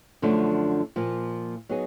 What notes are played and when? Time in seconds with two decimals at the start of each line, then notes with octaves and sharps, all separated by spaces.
0.22 F#2 D3 F3 A3 D4
0.96 A#2 F3 A#3
1.69 F#3 B3 D#4 G#4